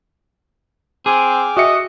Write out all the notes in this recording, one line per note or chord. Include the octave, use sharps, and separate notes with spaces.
C4 G#4 G5 D6 F6
F#4 D#5 E5 C#7